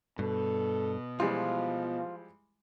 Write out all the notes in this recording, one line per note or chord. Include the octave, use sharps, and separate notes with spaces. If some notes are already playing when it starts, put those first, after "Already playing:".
G2 B2 A4
E3 F3 G3 G#3 F4